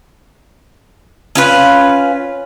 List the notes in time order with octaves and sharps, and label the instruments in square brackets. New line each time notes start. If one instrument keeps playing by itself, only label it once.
[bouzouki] C#4 F4 B4